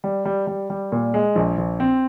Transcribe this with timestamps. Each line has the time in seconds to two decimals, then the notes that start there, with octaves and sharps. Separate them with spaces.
0.04 G3
0.25 G3
0.47 G3
0.70 G3
0.92 A#2
1.14 G#3
1.35 A#1
1.58 A#1
1.80 C4